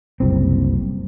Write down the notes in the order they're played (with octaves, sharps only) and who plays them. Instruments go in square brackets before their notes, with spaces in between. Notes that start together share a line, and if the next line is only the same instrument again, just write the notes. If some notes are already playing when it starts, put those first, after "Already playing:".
[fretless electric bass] F#1 C2 C4